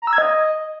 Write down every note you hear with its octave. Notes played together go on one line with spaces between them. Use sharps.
A#5
E6
G#6
D#5